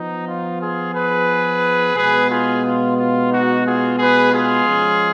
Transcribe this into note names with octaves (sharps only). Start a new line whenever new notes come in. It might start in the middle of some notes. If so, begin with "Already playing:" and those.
Already playing: F3 B3 D#4
F4
F4 G#4
G#4 B4
B2 G#3 B3 G#4 B4
F4 G#4
F4
F4
D#4 F#4
F4 G#4
G#4 B4
F4 G#4
F3 G#3 C#4